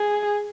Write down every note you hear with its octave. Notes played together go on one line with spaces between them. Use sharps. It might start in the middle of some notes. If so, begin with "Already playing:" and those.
Already playing: G#4